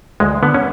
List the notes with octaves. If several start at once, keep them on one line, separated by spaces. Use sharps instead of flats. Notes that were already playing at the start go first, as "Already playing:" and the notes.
D2 G#3
D3 B3
C#4